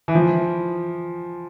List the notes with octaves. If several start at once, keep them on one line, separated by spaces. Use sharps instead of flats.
E3
F3